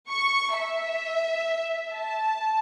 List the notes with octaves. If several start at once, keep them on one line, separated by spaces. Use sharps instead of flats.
C#6
E5
A5